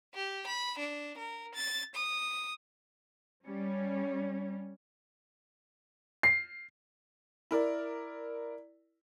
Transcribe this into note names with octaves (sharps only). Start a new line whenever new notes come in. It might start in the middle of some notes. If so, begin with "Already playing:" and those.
G4
B5
D4
A#4
A6
D#6
G3 C#4
C7
E4 A#4 D5